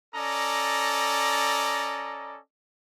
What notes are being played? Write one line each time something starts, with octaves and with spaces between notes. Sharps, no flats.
C#4 A4 D5 D#5 A#5